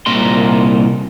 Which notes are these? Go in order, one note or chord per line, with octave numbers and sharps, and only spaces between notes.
C2 A#2 D#4 A#4 C6